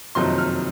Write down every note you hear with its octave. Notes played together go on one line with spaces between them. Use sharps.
F#1 F2 C3 D#3 F#3 C6
F6